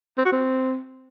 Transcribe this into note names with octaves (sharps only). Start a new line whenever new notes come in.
C4
F#4
C4